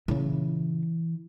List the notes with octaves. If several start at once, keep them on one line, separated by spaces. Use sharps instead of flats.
A#2 C#3 E3